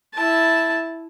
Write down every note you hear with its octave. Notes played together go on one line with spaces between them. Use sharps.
E4 A5